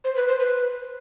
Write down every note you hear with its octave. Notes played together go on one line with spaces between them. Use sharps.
C5
B4
C5
B4